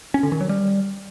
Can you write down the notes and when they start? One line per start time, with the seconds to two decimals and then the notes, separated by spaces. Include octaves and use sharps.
0.14 C#4
0.23 D3
0.32 D#3
0.41 F#3
0.49 G3